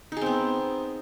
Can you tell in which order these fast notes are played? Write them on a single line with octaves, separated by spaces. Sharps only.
D#4 G#4 C4 B3